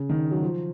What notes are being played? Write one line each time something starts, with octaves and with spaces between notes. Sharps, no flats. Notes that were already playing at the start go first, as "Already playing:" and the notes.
Already playing: C#3
D#3
F#3
F3